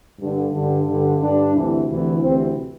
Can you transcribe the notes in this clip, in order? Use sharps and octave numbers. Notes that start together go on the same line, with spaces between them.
G2 D3
G2 D3
G2 D3
G2 D3 D4
D2 C3 E3
D2 C3 E3
D2 C3 E3 C4